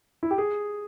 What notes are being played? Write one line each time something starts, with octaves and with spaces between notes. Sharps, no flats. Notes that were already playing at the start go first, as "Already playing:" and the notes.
E4
G4
G#4